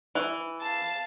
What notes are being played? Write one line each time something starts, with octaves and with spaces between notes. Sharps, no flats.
E3
F5 A5